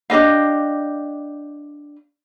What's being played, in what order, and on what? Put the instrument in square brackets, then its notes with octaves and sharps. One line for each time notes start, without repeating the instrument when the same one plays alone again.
[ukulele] D4 G4 D#5 F5